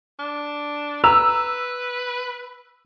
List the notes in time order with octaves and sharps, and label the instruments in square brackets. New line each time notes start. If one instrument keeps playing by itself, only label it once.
[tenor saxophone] D4
[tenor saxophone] B4 [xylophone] A#5 [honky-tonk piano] E6